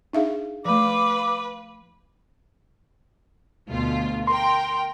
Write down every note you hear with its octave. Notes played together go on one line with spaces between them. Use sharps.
D4 D#4 G#4 E5 F5
F3 A3 B4 F5 D6
D2 B2 F4
A#4 G5 C6